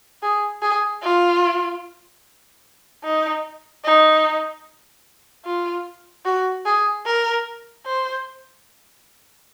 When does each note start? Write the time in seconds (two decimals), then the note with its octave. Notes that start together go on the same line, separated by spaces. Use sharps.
0.23 G#4
0.62 G#4
1.02 F4
3.04 D#4
3.84 D#4
5.45 F4
6.25 F#4
6.65 G#4
7.06 A#4
7.86 C5